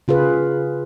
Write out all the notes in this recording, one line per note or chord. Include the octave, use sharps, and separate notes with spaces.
C#3 F4 G#4 B4